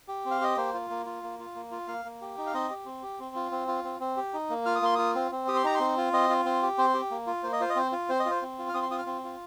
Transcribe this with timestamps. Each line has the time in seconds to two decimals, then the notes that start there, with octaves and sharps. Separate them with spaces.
0.08 G4
0.25 C4
0.31 F5
0.41 G4 D#5
0.57 A#3 C5
0.74 F4
0.90 A#3
1.06 F4
1.23 A#3
1.39 F4
1.56 A#3
1.71 F4
1.88 A#3 F5
2.05 A#3
2.21 G4
2.38 D#4
2.46 F5
2.54 C4 D#5
2.70 G4
2.86 C4
3.03 G4
3.20 C4
3.36 F4
3.52 C4
3.68 F4
3.84 C4
4.00 C4
4.17 G4
4.34 D#4
4.50 A#3
4.66 F4 F6
4.76 D#6
4.82 A#3 C6
4.95 F4 D#6
5.15 C4
5.31 C4
5.48 G4 D#6
5.57 C6
5.64 D#4 A#5
5.75 C4 C6
5.97 F4
6.13 C4 D#5
6.29 F4
6.45 C4
6.63 G4
6.78 C4 C5
6.94 G4
7.11 A#3
7.27 F4
7.43 A#3 C5
7.53 D#5
7.60 F4 C5
7.70 D#5
7.76 C4 C5
7.92 F4
8.09 C4 C5
8.20 D#5
8.26 F4
8.31 C5
8.42 C4
8.58 F4
8.69 F6
8.74 C4 D#6
8.83 C6
8.91 F4 D#6
8.98 F6
9.07 C4
9.24 F4